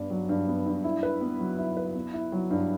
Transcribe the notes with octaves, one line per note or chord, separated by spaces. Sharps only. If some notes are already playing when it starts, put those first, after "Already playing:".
Already playing: G2 B3 D4
F#3
G2
B3
G2
E4
B4
B3
F#3
E4
B4
B3
E4
F#3
G2